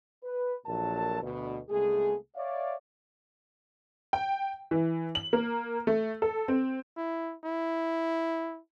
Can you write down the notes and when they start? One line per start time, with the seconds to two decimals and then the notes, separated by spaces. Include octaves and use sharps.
0.24 B4
0.66 A#1 A#2 F#3 A4 A#4 A5
1.23 D2 B2
1.70 C2 G#3 A3 B3 G#4
2.36 C#5 D5 E5 F5
4.13 G5
4.71 E3
5.15 F#7
5.33 A#3
5.87 A3
6.22 A4
6.48 C4
6.97 E4
7.44 E4